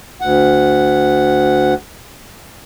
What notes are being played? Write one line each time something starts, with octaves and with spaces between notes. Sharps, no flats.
D2 F#5